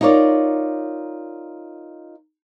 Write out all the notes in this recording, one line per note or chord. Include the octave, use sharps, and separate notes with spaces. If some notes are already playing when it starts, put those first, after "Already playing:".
D#4 F4 A#4 C#5 D5